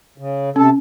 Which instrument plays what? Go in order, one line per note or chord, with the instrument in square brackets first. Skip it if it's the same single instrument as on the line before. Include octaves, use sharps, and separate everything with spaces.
[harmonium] C#3
[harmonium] C3 A4 [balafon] C#4